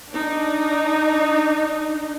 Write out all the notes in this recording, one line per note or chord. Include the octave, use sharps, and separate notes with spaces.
D4 D#4